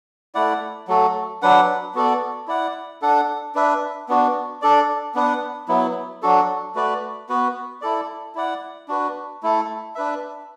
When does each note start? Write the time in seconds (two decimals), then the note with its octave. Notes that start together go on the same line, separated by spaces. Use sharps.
0.35 A3 E4 D5 F#5
0.88 F#3 A3 F#4 A4
1.42 F#3 D4 B4 F#5
1.95 B3 F#4 A4 D5
2.48 E4 D5 F#5
3.02 D4 A4 F#5
3.55 D4 B4 E5
4.09 B3 D4 F#4
4.62 D4 A4 D5
5.15 B3 D4 B4 F#5
5.68 F#3 B3 E4
6.23 F#3 D4 F#4 A4
6.75 A3 F#4 B4 D5
7.29 B3 F#4 B4
7.82 E4 A4 D5
8.35 E4 D5 F#5
8.88 D4 F#4 B4
9.43 A3 E4 A4
9.95 D4 B4 E5